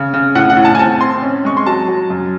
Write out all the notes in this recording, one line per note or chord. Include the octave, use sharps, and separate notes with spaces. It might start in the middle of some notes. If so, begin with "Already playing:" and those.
Already playing: C#3
C#3
A2 F#5
F#5
A2
A5
G#5
C4 A5
C4 C6
C#4
G#3 C#6
C6
F#3 A5
F#3
F#2